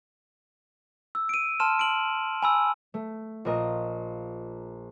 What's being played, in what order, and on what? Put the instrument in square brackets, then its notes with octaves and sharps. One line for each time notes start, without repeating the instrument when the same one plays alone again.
[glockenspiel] E6
D7 D#7
A5 C6 F6 E7
D7 F#7
G#5 B5 E6
[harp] A3
A#1 F4 A#4 D#5 A#5